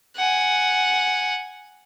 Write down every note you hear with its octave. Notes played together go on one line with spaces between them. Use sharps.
F#5 G#5